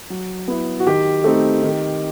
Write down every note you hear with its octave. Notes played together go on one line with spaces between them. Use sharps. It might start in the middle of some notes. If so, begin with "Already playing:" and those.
F#3
B3 E4
F#4
D#3 G4
A3 C4 D#4
D#3